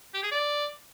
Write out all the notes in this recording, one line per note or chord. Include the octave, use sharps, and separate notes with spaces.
G4
G#4
D5